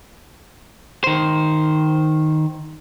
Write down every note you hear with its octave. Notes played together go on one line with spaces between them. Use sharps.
D#3 C5